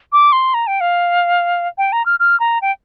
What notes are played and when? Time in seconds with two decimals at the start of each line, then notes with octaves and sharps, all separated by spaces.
0.12 D6
0.32 C6
0.54 A#5
0.67 G5
0.81 F5
1.78 G5
1.92 A#5
2.06 F6
2.20 F6
2.40 A#5
2.62 G5